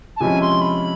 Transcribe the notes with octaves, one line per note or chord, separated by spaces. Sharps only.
A5
C3 F3 G#3 C#4 E4 G#5
C6
B5